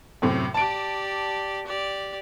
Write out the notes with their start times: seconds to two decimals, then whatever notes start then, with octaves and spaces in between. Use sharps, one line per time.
0.22 F#2 A2 C3
0.54 G4 D5 A5 D7
1.66 G4 D5